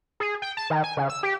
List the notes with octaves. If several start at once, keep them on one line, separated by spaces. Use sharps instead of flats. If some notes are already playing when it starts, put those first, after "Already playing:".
G#4
G5
A5
D#3
G#5
C#3
E6
G4